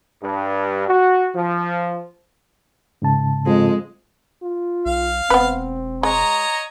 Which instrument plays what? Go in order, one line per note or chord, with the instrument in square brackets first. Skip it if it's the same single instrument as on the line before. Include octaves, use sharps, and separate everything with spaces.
[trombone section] G2
F#4
F3
[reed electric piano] G#2 C#3 A5
[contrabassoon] F2 [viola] G#3
[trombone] F4
[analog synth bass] B1 [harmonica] F5
[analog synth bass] E1 [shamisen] B3 B4 [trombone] C4
[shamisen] G#3 [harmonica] C#5 D#5 A#5